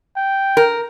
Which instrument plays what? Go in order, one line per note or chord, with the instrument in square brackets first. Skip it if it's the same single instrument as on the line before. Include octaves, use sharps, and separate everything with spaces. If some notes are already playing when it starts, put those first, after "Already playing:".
[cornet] G5
[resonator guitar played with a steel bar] A#4